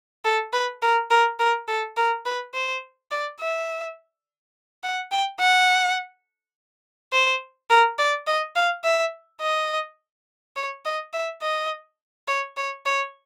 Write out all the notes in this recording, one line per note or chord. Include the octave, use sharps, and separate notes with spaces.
A4
B4
A#4
A#4
A#4
A4
A#4
B4
C5
D5
E5
F#5
G5
F#5
C5
A#4
D5
D#5
F5
E5
D#5
C#5
D#5
E5
D#5
C#5
C#5
C#5